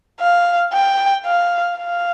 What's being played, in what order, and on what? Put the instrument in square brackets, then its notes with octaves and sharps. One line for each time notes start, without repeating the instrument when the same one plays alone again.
[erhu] F5
G5
F5
F5